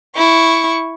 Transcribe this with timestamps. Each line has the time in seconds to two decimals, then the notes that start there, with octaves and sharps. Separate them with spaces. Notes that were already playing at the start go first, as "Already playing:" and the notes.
0.17 E4 C#6